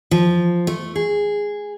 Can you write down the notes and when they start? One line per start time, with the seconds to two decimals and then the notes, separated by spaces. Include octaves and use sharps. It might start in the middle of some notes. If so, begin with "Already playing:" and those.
0.11 F3
0.67 A3
0.96 G#4